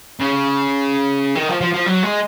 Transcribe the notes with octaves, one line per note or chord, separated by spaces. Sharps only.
C#3
D#3
F3
F3
F3
F#3
G#3